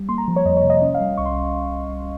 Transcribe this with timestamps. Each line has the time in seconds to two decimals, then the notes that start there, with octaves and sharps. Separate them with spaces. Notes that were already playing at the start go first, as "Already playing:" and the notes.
Already playing: G3
0.09 A#3 C6
0.18 A#5
0.28 F3
0.36 C#5
0.45 F2 D#5
0.57 C#5
0.63 C3
0.70 D#5
0.81 C#4 D#5
0.94 F5
1.00 G3
1.17 C2 C#6
1.26 C6